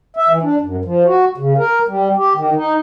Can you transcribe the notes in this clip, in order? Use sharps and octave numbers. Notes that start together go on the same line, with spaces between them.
E5
E3
D4
F#2
F3
F#4
C#3
A#4
G3
G4
D#3
D#4